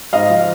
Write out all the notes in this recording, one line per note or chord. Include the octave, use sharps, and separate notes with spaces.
G#2 D#5 F5
F3